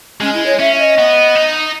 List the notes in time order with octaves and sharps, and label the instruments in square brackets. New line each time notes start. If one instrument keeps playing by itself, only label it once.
[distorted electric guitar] G#3 [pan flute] C#4
[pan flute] E4
C#5
[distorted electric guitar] C#4 [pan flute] E5
[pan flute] D#5
[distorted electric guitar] B3
D#4